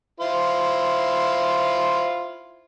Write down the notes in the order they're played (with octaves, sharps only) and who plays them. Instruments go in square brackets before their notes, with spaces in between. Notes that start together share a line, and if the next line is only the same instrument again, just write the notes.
[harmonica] E4 F4 C5